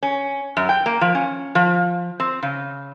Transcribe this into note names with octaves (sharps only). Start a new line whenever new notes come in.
C#4
F#2
G5
A#3
F3
C#4
F3
C4
C#3